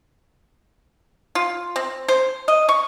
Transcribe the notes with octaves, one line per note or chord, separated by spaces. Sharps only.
F4
C4
C5
D#5
C#6